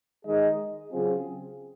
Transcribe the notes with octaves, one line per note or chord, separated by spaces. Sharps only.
D#3 G#3 D#4 G#4 D#5
C#3 F#3 C4 F4 G#4